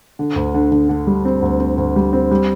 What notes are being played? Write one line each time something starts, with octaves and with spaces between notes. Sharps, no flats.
D3
D2
D3
D3
D3
G3
C4
D2
C4
D2
G3
C4
G3